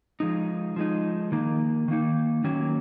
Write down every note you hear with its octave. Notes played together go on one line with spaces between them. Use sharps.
F3 G#3 D#4
F3 G#3 D#4
D#3 A#3 D#4
D#3 A#3 D#4
D#3 F#3 A#3 C#4